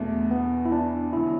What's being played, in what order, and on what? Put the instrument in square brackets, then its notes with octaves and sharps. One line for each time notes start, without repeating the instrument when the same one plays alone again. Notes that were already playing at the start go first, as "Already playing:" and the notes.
Already playing: [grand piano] E2 B2 B3 D4 F#4 [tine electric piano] A3
[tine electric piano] B3
E4
D4
[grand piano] E1 D3 F#3 [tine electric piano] E4